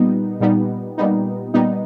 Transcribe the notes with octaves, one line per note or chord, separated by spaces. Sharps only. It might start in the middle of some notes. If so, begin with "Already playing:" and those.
Already playing: A#2 G3 B3 D#4
A#2 G3 B3 D#4
A#2 G3 B3 D#4
A#2 G3 B3 D#4